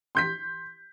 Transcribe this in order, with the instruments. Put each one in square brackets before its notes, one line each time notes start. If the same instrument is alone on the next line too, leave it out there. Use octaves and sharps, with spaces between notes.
[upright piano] C6 G6 B6